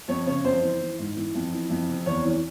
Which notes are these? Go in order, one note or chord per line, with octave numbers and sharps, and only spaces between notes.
F2 C#5
C#3 C#5
F2 C5
E3
E3
G#2
E3
F2
E3
F2
C3
E2 C#5
E3